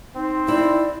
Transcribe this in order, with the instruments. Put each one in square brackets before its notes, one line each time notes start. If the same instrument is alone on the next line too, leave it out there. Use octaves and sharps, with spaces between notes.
[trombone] C4 [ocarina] D#4
[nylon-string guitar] E4 [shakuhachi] D5